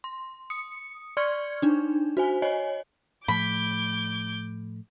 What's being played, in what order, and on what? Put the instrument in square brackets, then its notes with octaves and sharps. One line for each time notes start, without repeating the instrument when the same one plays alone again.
[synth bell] C6
D#6 C#7
D5 C6 C#6 F6 G#6 C#7
D4 D#4
F#4 C5 G#5
C#5 D#5 G#5
[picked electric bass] A2 F3 A3 [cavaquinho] B5 [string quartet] D6 G6